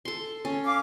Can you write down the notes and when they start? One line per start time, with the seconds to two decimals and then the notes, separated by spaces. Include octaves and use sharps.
0.05 A4 C6
0.45 C#4
0.66 F5 D6